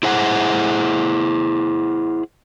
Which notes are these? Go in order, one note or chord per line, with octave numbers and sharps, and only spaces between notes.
E4 G#4 C5 F#5